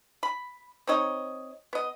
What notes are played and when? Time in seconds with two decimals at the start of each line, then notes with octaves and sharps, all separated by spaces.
0.23 B5
0.87 C4 D#4 C#5 D#5
1.73 B3 D#5